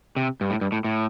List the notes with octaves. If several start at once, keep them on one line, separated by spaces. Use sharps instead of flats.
C3
G2
A2
G2
A2
A2